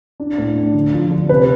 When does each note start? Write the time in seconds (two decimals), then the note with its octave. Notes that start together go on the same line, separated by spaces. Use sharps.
0.20 D4
0.38 A2
0.56 D4
0.74 D3
0.93 F3
1.11 D3
1.29 C3 B4